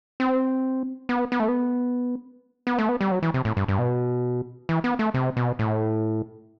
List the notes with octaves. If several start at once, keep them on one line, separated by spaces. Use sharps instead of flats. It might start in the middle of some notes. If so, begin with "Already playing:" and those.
C4
B3
B3
A3
B3
B3
A3
B3
G3
F#3
E3
C3
A2
G2
G2
B2
E3
B3
A3
C3
B2
A2